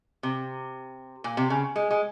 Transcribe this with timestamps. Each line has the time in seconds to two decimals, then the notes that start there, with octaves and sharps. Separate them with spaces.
0.23 C3
1.24 A#2
1.37 C3
1.50 C#3
1.76 G#3
1.91 G#3